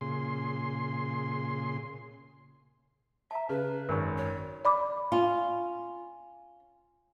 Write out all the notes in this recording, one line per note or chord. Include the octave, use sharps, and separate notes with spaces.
A#2 C#3 G#4 C6
E5 A5 A#5
C#3 B4
G#1 F#2 A#4 C#6
C#5
D5 B5 D6
C#4 F4